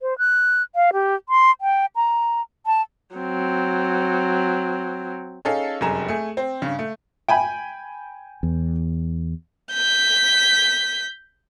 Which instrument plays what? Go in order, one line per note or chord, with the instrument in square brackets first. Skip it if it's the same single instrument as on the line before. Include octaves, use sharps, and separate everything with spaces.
[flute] C5
F#6
F5
G4
C6
G5
A#5
A5
[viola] F#3 C4
[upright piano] C#4 D#4 G#4 A4 F5
F1 F#2 G3 G#4 A#5 E7
A3 G#4
C4 C5
G2 C#3
A3
[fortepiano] G5 G#5 B5
[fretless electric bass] E2
[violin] G6 B6